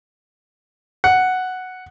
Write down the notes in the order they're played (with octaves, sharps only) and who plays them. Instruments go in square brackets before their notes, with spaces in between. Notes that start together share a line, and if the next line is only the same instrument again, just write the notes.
[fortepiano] F#5